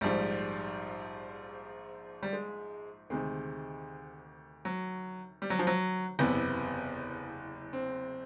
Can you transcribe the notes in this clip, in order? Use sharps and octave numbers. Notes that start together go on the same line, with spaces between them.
A#1 G#2 F3 G3
G3
G#3
D2 C3 D#3 G#3
F#3
G3
F#3
F3
F#3
F#1 E2 C3 B3
C4